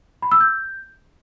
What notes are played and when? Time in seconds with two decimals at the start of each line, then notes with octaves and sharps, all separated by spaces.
0.22 B5
0.32 E6
0.41 G6